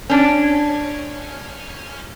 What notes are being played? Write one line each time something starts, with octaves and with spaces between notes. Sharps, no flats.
C#4 D4